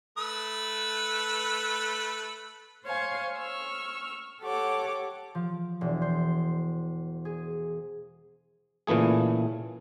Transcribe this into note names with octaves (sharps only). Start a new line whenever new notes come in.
A3 B4 E6
C5 C#5 F5 G#5 C#6
C#6 E6 F6
G4 A4 C#5 F#5 D6
F3
E1
C5
G#4
A#2 C#3 E3 A3 G#4